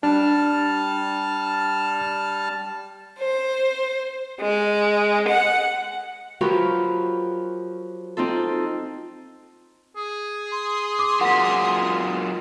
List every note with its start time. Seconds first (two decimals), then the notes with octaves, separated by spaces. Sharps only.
0.03 G3 D4 A5 F6
3.19 C5
4.39 G#3
5.28 F#5
6.41 F3 F#3 F#4 G4 A#4 B4
8.17 C4 D#4 F4 A4
9.96 G#4
10.52 C6
10.99 D6 D#6
11.21 F#3 F4 A#4 F#5 B6